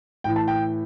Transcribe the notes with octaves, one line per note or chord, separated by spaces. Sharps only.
A2 E3 G5
A5
G5